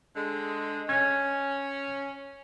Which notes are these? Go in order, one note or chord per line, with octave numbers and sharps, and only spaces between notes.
D3 G#3
C#4 G#6